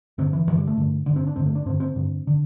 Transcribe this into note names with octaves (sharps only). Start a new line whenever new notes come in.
G2 D3 C4
E3
G2 D3 E3
G3
A3
G2 D3
G2 D3
C4
D4
G2 D3 C4
A3
D4
G2 D3 C4
C4
G2 D3
D3